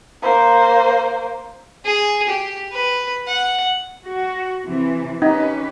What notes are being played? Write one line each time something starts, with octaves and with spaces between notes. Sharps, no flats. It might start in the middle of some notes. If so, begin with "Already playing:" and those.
A#3 C5
G#4
G4
B4
F#5
F#4
C3 E3
C#4 D#4 G4 B4